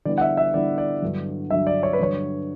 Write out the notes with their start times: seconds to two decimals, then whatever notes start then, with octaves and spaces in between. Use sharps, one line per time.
0.05 D3 G3 B3 E4 D5
0.18 F#5
0.21 E5
0.37 E5
0.54 D3 G3 B3 E4 D5
0.78 D5
1.02 G2 D3 F#3
1.51 G2 D3 F#3 E5
1.67 D5
1.83 C#5
1.93 B4
1.99 G2 D3 F#3 C#5